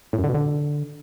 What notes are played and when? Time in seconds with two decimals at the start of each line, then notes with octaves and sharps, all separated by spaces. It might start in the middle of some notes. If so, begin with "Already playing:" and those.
0.13 A2
0.19 F#2
0.24 D3
0.29 B2
0.35 D3